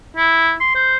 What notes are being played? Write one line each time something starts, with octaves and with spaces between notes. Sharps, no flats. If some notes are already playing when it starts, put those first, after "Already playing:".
E4
C6
C5